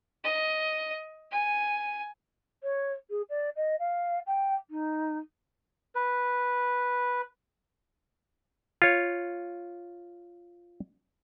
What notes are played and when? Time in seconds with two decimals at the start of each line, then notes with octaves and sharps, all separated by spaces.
0.24 D#5
1.31 G#5
2.63 C#5
3.10 G#4
3.29 D5
3.56 D#5
3.79 F5
4.26 G5
4.70 D#4
5.95 B4
8.82 F4 C#5